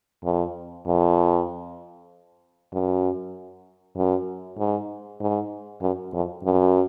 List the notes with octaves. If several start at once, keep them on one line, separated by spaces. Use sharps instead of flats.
F2
F2
F#2
F#2
G#2
G#2
F#2
F2
F#2